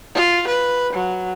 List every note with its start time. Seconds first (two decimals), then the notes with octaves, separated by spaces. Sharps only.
0.15 F4
0.47 B4
0.93 F#3